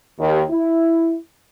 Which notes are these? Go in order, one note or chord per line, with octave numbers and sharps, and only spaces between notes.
D#2
E4